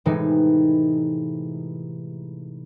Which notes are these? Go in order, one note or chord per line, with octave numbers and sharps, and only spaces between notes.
A2 C3 E3 G#3 D#4